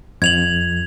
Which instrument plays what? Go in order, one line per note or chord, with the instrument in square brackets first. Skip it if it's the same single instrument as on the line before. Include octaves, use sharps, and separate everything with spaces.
[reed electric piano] F2 [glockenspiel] G#6 F7 F#7